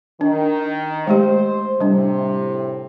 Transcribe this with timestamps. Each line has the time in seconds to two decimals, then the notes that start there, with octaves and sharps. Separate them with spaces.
0.21 D#3 D4
1.07 G#3 A3 G4 C5
1.81 A2 C3 G3 D4